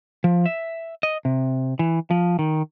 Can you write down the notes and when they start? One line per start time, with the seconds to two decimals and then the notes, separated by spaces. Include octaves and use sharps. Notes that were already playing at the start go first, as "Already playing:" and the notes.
0.24 F3
0.46 E5
1.03 D#5
1.25 C3
1.79 E3
2.11 F3
2.39 D#3